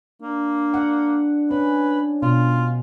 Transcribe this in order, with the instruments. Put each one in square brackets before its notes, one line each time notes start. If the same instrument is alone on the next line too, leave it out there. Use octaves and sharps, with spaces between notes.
[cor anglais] A#3 [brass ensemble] D4
[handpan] F#5
[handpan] C#4 [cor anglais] B4
[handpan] B2 [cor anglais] F4